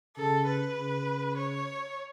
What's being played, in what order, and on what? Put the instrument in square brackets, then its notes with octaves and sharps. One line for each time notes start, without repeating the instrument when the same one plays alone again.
[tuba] C#3 [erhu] A4
[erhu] B4
[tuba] C#3
[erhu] C#5